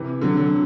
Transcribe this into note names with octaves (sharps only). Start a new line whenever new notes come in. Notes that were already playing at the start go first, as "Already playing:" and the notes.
Already playing: C3 E3
D3 F#3
D3 F#3